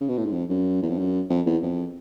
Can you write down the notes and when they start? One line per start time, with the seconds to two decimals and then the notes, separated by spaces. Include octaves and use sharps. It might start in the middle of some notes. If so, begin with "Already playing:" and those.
0.01 C#3
0.09 B2
0.18 A2
0.25 G#2
0.33 F2
0.50 F#2
0.82 E2
0.90 F2
0.98 F#2
1.30 F2
1.46 E2
1.63 F2